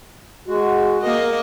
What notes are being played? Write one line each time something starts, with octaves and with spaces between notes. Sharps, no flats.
G#3 F#4
A#3 A#4 D#5